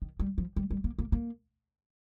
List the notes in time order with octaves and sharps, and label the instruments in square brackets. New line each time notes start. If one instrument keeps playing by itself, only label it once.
[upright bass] D#3
G3
F3
G3
G3
A#3
A#3
A#3